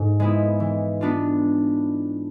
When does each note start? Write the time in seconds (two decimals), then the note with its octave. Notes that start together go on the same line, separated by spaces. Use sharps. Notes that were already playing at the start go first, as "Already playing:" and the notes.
Already playing: G#2
0.20 G#3 B3 E4
0.60 E3
1.01 B3 D4 F4